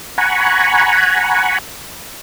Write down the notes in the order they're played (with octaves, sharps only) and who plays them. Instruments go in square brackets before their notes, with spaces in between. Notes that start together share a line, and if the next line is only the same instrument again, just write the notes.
[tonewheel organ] F#5 G#5 A#5 B5 C#6